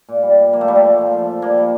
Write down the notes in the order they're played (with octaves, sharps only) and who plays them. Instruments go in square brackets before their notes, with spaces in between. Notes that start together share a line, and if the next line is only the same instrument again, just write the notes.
[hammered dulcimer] A#2
G3
G3
F3 A#3
A3
A#2 G3
A3
F3
F3
F3
F3
G3 A#3
G3